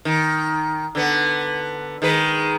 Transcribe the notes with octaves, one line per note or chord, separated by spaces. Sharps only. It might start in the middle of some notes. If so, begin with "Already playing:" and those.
D#3
D3 B3
D#3 G#3 B4